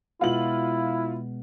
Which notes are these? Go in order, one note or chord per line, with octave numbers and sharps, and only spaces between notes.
B2 G#3 B3 E4 F4 F#7